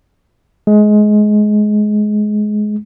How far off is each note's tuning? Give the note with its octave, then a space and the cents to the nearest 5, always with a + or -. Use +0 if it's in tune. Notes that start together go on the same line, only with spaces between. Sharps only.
G#3 +20